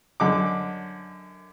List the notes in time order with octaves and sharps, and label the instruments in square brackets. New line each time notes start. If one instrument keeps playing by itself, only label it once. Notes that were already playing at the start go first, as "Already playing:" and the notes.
[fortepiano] F#2 D3 D#5 D6